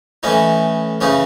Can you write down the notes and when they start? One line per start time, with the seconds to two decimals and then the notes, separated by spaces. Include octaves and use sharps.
0.23 A2 E3 C#4 D#4
1.01 C#3 E3 C#4 D#4